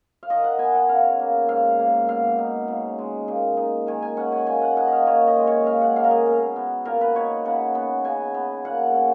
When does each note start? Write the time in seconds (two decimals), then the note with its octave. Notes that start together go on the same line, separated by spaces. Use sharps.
0.23 F5
0.30 D#3 D#5
0.44 F#5
0.59 B3 G#5
0.75 F#5
0.89 C#3 F5
1.19 A#3
1.49 G#2 F5
1.79 A#3
2.08 B2 F5
2.38 D#4
2.68 C#3
2.98 G#3
3.28 A#2
3.57 D#4
3.87 D#3 G#5
4.02 G#5
4.17 C#4 F#5
4.32 G#5
4.47 A#2 G#5
4.61 F#5
4.77 D#4 F#5
4.88 D#5 F5
5.07 A#2 C#5
5.27 D#5
5.36 G#3
5.47 C#5
5.66 C#3 F5
5.81 F#5
5.96 A#3 F5
6.04 A#4
6.11 G#4
6.26 B2
6.56 B3
6.85 A#2 A#4
7.01 B4
7.15 D#4 C#5
7.46 C#3 F#5
7.75 B3
8.05 C#3 G#5
8.34 B3
8.65 A#2 F#5
8.94 C#4